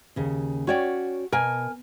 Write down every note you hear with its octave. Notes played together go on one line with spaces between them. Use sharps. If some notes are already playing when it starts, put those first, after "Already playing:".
D#2 C#3
C#4 F#4 C#5 D5 G5
B2 A#4 G#5